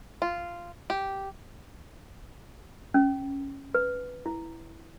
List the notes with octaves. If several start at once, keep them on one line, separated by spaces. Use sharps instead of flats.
F4
G4
C#4
B4
E4